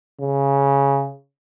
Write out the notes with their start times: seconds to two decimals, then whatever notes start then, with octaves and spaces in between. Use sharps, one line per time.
0.21 C#3